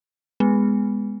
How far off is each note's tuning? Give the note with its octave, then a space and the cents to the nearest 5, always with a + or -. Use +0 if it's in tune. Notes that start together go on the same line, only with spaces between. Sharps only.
G#3 -10 B3 +0